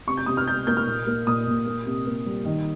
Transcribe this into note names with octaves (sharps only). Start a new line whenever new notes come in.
C3 C#6
G6
C3 D#6
F6
C3 G6
A#3 G6
F6
A#2
A#3
A#2 D#6
A#2
A#3
C3
A#3
G3
D#3